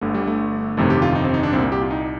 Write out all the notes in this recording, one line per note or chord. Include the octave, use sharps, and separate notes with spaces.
G1 G2 D3 A3
G3
A3
G1 F2 C3 D#3 A3
G4
F4
D#4
C4
D#4
D4
C2 A#2 C4
A#3
G4
F4
D#4